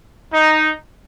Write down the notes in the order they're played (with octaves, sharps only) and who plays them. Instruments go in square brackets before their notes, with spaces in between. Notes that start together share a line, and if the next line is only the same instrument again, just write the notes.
[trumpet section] D#4